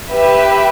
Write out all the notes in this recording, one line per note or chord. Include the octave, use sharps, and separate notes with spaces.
G4 B4 E5